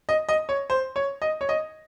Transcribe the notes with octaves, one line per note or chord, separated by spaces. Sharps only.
D#5
D#5
C#5
C5
C#5
D#5
C#5
D#5